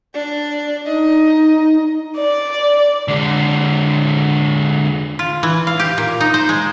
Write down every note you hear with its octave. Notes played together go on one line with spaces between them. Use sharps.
D4
D#4 D#5
D5
D3 G#3
F4
E3
F5
G4
A#2
D#4
C5
G#3